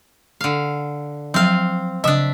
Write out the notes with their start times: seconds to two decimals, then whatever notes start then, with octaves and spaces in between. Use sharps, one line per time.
0.41 D3 F5
1.34 F3 F#3 C4 F5
2.04 C#3 D4 D#5 E5